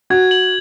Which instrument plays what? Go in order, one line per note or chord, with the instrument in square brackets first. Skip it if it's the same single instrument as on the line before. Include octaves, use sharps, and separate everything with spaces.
[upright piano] F#4 [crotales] G#6
[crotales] F#7